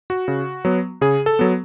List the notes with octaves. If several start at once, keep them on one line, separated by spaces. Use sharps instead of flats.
F#4
C#3
F#3 B3
C#3 G#4
A4
F#3 B3